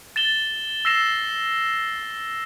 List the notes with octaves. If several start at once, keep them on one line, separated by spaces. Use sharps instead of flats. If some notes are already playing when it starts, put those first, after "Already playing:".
A6 E7 G7
E6 A#6 C7 E7 G7